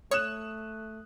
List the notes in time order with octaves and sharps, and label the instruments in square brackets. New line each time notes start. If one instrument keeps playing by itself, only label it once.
[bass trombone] A3 [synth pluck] C#5 [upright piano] D#6 F#6 E7